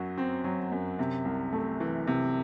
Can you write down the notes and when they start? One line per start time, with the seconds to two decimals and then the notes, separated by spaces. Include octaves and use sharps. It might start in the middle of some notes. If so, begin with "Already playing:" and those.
Already playing: F#2 F#3 F#4
0.18 C4
0.44 F#3
0.72 F#2
0.99 C3
1.25 C2
1.53 A3
1.80 E3
2.07 C3